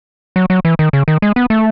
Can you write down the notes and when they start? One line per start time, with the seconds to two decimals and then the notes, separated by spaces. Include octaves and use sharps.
0.36 F#3
0.50 F#3
0.65 E3
0.79 D#3
0.93 C#3
1.08 D#3
1.22 G#3
1.36 B3
1.50 A3